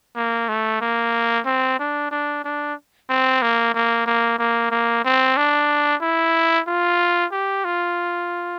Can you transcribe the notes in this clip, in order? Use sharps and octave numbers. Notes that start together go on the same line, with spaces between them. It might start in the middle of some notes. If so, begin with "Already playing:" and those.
A#3
A3
A#3
C4
D4
D4
D4
C4
A#3
A#3
A#3
A#3
A#3
C4
D4
E4
F4
G4
F4